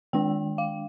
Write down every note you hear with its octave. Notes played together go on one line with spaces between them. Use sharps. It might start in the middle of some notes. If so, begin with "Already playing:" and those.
D#3 G#3 D4 G5
F5